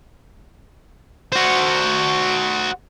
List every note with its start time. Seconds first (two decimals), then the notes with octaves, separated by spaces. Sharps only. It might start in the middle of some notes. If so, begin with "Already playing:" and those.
1.32 F#4 C5